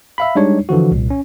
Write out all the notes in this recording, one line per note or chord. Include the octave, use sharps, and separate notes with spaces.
E5 F5 B5
G3 G#3 D4 D#4 C#5
D3 E3 F3 F#4
C2 A#2
C#4